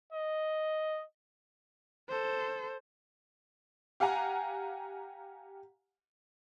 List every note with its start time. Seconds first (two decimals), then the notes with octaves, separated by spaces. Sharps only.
0.13 D#5
2.09 A4 C5
4.00 G4 F5 F#5 G#5 A#5